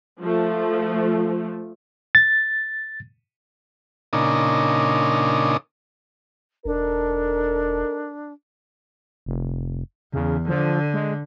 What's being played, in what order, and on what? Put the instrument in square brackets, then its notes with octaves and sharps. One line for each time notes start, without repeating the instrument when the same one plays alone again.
[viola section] F3 A3
[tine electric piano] A6
[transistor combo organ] A#2 C#3 D4 D#4
[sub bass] E1 [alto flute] D4 [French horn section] D#4 A4 A#4
[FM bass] F1
[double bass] E2 [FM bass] C#3
[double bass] D3 [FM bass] F3
[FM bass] G#3